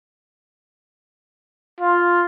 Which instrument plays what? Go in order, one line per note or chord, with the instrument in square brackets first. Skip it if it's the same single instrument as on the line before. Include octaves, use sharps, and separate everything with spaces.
[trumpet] F4